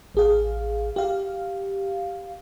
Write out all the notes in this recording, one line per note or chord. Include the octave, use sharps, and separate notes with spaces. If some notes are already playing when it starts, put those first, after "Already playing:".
A1 G#4 F5
G4 F5